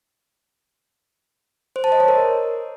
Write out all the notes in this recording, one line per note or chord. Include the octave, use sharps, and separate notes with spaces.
C5
A5
D#5
C#5
A#4